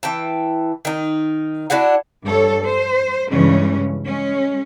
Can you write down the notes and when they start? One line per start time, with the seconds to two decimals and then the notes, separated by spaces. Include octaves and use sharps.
0.03 E3 G5 A5
0.85 D#3 D#4
1.70 D4 E4 F#4 F#5
2.26 G2 G3 A4 C#5
2.64 C5
3.31 G2 C#3 E3 G#3 C#4
4.05 G#3 C#4